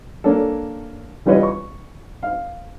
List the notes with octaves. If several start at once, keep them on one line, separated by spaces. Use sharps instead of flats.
A#3 C#4 D4 A4
E3 G3 F4 B4 C#5 D#5
C#6
F5